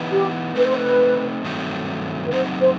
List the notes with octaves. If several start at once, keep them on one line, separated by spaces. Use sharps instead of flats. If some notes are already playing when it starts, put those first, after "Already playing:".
Already playing: E3 B3 D#4
G4
A3 C4 D#4 B4
C5
B4
G2 D#3 F#3 A3 C4
B4
F#2 F#3 A3 C4 D#4 C5
C5